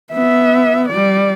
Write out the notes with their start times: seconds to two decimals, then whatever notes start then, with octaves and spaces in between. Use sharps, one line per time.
0.13 B3 E5
0.89 G3 D5